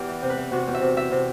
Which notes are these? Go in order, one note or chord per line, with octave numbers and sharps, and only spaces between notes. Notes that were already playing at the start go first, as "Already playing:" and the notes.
Already playing: E2 E4 G4
E3
C3
B4
E3
C3 F#4
E2
E5
C3
E3 E5
C3